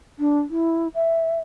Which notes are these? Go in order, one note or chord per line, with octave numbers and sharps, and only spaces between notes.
D4
E4
E5